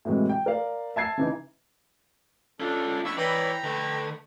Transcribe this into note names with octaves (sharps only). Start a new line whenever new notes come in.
A2 C3 E3 F#3 G#3
G5
A#4 D5 F5
E5 A5 G#6 C7
C#3 E3 D#4
C#4 D4 F4 A4
D4 E4 B5 C#6 E6
E3 C#5 D5 G5 A#5 B5
D3 A3 B4